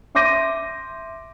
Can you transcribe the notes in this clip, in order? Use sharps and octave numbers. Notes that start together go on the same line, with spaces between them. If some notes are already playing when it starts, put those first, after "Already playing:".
E5 C6 D6 G6 A#6 D#7